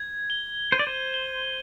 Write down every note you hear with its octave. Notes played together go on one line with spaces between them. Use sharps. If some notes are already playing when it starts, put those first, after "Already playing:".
Already playing: G#6
G7
C5 D#7
D5
C5
G7